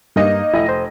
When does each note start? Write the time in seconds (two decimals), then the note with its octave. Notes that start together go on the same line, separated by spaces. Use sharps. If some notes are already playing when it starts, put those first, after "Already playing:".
0.16 G2 A#3 D#4 D#5
0.54 F1 E4 D#5 A#6
0.69 C5